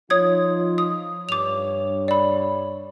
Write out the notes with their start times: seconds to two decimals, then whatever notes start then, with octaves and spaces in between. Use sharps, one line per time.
0.10 F3 D#4 F4 C#5 D#6 G#6
0.78 D#6
1.29 G2 C#5 D6 F7
2.08 D5 B5